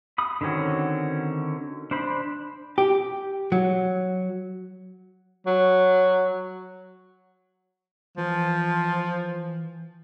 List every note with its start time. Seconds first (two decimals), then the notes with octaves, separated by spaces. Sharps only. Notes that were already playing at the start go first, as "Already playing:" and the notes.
0.18 B5 D#6
0.41 D3 D#3 C4 C#4 F#4
1.91 D4 C5 B5
2.78 G4
3.52 F#3
5.46 F#3
8.18 E3 F3